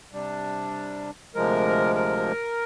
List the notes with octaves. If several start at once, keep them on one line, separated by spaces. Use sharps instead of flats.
C3 G3 D4
D2 C3 F3 G#3 A#4
A#4